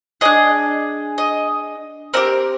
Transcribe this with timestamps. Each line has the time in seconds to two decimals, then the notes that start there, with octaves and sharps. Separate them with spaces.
0.21 D4 G#4 D#5
1.18 D#5
2.14 C4 D#4 G4 A#4